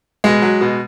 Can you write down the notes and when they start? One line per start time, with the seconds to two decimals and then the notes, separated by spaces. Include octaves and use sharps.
0.24 B2 G#3
0.42 F#3
0.61 B2